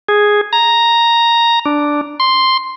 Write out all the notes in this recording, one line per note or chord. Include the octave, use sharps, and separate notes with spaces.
G#4
A#5
D4
C6